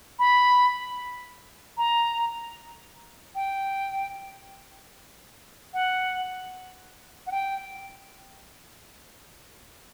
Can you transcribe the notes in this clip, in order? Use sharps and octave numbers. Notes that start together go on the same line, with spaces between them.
B5
A#5
G5
F#5
F#5
G5